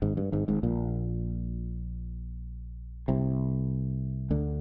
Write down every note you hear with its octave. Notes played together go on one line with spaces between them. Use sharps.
G#1 G#2
G2
G#1 G#2
G#1 G#2
A#1 A#2
C2 C3
D2 D3